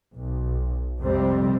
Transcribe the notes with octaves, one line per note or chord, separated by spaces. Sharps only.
B1
F2 C3 G3 C4